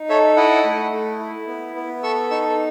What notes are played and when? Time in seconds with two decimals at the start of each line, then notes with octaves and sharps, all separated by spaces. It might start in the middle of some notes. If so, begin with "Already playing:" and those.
Already playing: D#4
0.09 A4 C#5 E5
0.36 E4 D#5 F#5
0.65 A3
0.92 A3
1.20 E4
1.47 B3
1.75 B3
2.03 A4 C#6 E6
2.30 D#4 C#6 E6